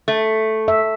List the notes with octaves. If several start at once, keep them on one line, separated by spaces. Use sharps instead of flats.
A3
E5